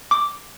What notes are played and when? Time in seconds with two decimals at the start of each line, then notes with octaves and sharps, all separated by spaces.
0.11 D6